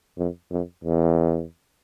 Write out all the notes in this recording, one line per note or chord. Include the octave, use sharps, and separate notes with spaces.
F2
F2
E2